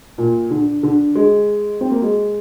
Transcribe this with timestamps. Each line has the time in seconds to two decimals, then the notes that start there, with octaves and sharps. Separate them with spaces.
0.18 A#2
0.51 D3
0.83 D3
1.15 G#3
1.81 C4
1.91 A#3
2.02 G#3